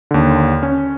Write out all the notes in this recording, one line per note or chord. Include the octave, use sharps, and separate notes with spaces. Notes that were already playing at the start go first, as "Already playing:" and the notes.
D#2 D3
C#4